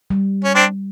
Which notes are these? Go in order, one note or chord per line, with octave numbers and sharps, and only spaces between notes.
G3
C#4
C4 D4